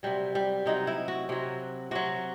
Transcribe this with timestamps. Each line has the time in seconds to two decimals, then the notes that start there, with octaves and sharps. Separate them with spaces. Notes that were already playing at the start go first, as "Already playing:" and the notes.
0.03 C3 F#3 G3
0.35 G3
0.66 C3 F#3 D#4
0.87 E4
1.08 F#4
1.29 C3 F#3
1.91 C3 F#3 F#4